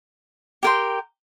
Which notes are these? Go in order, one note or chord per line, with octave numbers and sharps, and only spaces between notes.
G4 A#4 G5 C6